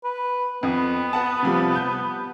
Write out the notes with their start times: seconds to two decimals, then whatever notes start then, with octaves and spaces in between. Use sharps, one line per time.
0.04 B4
0.63 F2 B3
1.13 B4 F#5 A5
1.43 C3 F3 G3
1.72 A5 G6